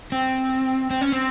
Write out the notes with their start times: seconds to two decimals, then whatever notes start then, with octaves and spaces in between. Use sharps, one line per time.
0.12 C4
0.91 C4
1.01 C#4
1.12 C4